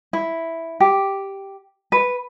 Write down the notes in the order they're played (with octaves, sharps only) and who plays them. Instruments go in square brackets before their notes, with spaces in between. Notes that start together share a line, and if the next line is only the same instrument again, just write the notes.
[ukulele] E4
G4
B4